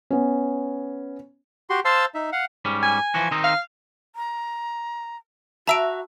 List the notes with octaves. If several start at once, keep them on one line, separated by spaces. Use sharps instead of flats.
B3 C#4
F#4 G4 C6
C5 F5 A5 C6 E6
D#4 E5
F5 F#5
G#2 G3 C#4
G#5
E3 F3 F#4
D#3 C4 D#4
F5
A#5
F#4 E5 A5 A#5 E6 D7